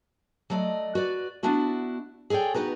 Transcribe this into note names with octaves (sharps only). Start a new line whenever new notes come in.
F#3 A3 D5 D#5
F#4 B4 D5
B3 D4 E4 F#4 E5
G#4 A4 C#5 D5 G5
B3 D#4 F#4 B4 A#5